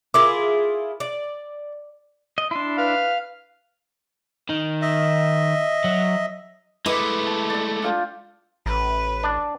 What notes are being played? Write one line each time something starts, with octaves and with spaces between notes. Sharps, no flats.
E4 F4 G#4 A#4 D6
D5
D#5
D4 E4 C6
B4 F5
D#3
D#5 E5
F#3
G#3 A3 E4 B4 D#5 D6 D#6
A5
D5 E6
D4 F4 G5
A1 B4
D4 D5